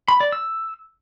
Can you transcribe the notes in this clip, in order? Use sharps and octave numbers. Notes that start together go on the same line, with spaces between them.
B5
D5
E6